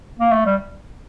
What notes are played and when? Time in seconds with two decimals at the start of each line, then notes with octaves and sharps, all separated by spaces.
0.20 A#3
0.32 A3
0.46 G3